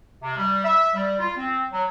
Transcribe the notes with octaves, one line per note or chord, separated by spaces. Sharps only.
C3
G3
E5
G3
F4
C4
F#3